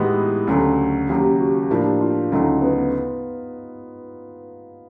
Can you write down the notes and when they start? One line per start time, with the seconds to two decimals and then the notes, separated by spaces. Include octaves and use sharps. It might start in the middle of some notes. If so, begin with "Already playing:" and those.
Already playing: A2 E3 G#3 B3 D#4 F#4 G4
0.47 D2 C#3 F#3 A3
1.09 D#2 C#3 F#3 G4
1.39 F#4
1.70 A2 F3 A#3 D4 F4 G4
2.01 F4
2.32 D2 C#3 F#3 A3 D#4
2.62 B3